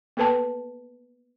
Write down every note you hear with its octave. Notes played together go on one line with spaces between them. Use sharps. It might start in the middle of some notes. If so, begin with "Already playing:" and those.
A#3 B3 A4 B4 G5 A5